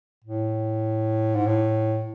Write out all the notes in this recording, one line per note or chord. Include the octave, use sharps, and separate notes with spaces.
A2
G#2
A2